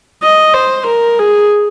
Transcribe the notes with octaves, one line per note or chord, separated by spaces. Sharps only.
D#5
C5
A#4
G#4